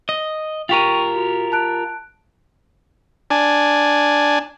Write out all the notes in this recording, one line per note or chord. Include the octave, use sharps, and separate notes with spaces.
D#5
F4 G4 A#4 G5 C#6 D#7
F#4
A5 F#6 D7
D4 G#5